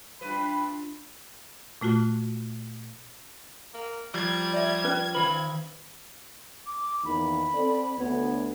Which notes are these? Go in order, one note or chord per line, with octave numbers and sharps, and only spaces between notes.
G2 D4 F4 B4 B5
A#2 A3 F4 F#4
A#3
F3 G3 G#6
D5 E5
G3 C#4 B4
D#3 F3 B4 B5
D6
E2 D#3 A#3 B5
C4 A4 D5
D2 B3 C#5